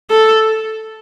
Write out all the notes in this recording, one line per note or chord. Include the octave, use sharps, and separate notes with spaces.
A4